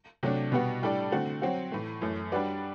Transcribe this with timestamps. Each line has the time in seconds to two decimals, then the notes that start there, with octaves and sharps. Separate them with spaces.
0.23 C3 F#3 A3 D4
0.52 B2 G3 B3 F#4
0.82 A2 G3 D4 A4 D5
1.12 D3 A3 C4 F#4
1.42 F#3 C4 F#4
1.72 A2 E3 A3
2.01 F#2 E3 A3
2.32 G3 D4 F#4 B4 D5